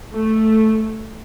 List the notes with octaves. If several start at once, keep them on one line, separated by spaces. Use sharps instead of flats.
A3